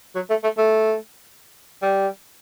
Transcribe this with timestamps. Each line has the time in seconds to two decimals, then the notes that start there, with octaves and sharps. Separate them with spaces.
0.15 F#3
0.30 A3
0.44 A3
0.57 A3
1.82 G3